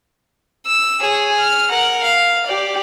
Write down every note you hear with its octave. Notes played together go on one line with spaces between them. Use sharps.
E6
G#4 C#5
F6
A#4 F#5
F5
G4 D5